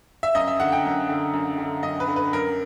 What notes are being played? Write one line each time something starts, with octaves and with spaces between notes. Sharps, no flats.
E5
F#2 D#5
E5
D3 F#5
G5
F#2
D3
F#2
D3
F#2 D#5
B4
D3
B4
F#2 A#4